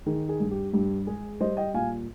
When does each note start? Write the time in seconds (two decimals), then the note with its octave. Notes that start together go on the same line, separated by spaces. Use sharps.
0.06 D#3 G#4
0.29 G#4
0.40 G2
0.51 G4
0.73 G2 G4
1.07 G#3 G#4
1.41 G3 C5 D#5
1.57 D#5 G5
1.74 A#2 F5 G#5